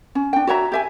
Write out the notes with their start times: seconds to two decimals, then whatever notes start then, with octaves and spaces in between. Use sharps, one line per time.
0.15 C#4
0.33 D4 G5
0.47 F#4 C#5 E5 A#5
0.72 G4 E5 G#5